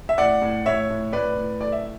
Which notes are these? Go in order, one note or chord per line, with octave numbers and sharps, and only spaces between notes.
E5
A2 D5 F#5
A2
A2 C#5 E5
A2
A2 B4 D5
A2
A3 D5
E5